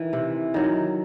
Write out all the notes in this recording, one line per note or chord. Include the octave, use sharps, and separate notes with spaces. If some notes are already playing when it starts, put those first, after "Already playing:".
Already playing: D#3 E3
C3
D#3 F#3